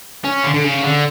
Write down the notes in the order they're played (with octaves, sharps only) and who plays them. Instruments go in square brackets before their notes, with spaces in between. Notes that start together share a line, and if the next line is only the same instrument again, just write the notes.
[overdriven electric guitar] C#4
D3
D3
C#3
D3